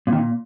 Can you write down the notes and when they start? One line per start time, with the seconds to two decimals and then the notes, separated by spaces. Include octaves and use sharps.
0.07 A#2
0.12 D#3
0.17 A#2